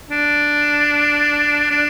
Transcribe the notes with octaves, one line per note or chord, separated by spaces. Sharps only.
D4
D4